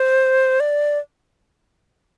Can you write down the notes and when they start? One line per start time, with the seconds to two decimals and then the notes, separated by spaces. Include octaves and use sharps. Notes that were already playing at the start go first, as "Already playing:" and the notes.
Already playing: C5
0.60 D5